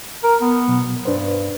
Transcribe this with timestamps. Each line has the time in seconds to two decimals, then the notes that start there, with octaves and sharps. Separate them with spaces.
0.24 A#4
0.41 B3
0.68 B2 F#3
1.05 G2 D4 B4 C5